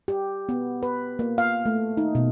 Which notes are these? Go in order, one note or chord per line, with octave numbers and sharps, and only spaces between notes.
G4
B3
B4
A#3
F5
A3
D#4
B2